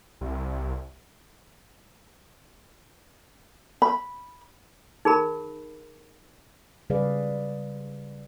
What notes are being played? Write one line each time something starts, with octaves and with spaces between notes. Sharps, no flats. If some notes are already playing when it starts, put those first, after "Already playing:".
C2
B5
D#4 G#4 A#4 B5
C#3 G3 G#4 B4 D5 F5